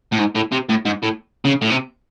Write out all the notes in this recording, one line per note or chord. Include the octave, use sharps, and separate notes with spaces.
A2
G#2
A2
C3
A2
G#2
A2
C#3
A2
C3